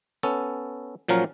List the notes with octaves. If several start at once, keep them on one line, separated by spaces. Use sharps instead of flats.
B3 C#4 A4
A#2 F3 F#3 C#4 A#4